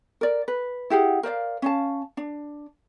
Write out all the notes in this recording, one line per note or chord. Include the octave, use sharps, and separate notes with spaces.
A#4 D5
B4
E4 G4 G#4 F#5
A#4 C5 D5 F5
C#4 F5 A5
D4